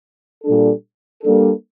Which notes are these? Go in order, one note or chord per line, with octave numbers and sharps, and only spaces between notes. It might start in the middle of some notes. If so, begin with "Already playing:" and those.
A#2 G3 D4 A4
G3 A#3 D4 A4